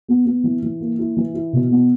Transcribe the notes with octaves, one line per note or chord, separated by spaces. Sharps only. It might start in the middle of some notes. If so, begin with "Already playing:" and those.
B3
B3
E3
E3
A#3
E4
E3
E4
B2
B3